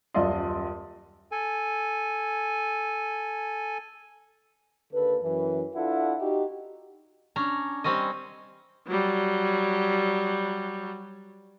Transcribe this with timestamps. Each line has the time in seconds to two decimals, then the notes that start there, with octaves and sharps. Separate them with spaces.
0.14 D#1 F#2 F4 D5 D#5 C6
1.32 A4 G#5
4.93 D#2 D3 A#3 A4 B4
5.23 F#2 E3
5.75 D4 E4 F4 A4 F#5
6.20 D#4 F#4 G4
7.36 C#4 D4 A#5
7.84 G3 C4 C#4 D#5
8.87 F#3 G3